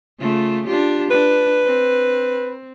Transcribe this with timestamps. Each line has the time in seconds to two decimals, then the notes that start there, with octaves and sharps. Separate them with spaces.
0.20 C#3 A3 F4
0.67 D4 F4 G4
1.11 D4 B4
1.64 C4